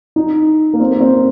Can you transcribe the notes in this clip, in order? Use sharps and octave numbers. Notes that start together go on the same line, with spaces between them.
D#4
A#3
C4
A#3
C4
A#3